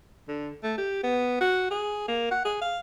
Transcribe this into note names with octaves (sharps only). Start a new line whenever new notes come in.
D3
A3
G4
B3
F#4
G#4
A#3
F#5
G#4
F5